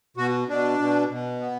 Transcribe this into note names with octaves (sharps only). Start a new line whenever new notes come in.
B2 F#4
B2 D4
B2
B2
B3